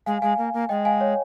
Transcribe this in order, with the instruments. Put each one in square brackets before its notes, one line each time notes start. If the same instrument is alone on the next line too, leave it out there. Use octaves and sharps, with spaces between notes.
[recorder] G#3 [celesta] F5 G#5
[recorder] G#3 [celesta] F5 G#5
[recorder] A#3
A#3
[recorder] G#3 [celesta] D#5 G5
[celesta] F5 G#5
C#5